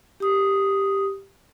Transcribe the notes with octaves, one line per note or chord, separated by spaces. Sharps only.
G4 D#6